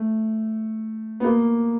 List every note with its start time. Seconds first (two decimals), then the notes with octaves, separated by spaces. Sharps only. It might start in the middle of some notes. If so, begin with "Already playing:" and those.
Already playing: A3
1.20 B3
1.24 A#3